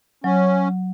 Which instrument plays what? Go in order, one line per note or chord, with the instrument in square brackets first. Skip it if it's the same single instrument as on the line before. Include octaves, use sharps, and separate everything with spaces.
[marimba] F#3 [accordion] C#4